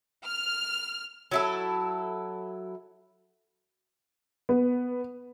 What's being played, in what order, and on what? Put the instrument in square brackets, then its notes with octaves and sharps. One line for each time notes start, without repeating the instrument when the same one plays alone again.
[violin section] F6
[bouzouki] F#3 E4 A4
[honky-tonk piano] B3